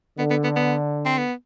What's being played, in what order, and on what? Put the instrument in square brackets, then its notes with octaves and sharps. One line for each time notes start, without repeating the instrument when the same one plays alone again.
[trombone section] D3 [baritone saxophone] B3
[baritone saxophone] B3
B3
B3
C4
B3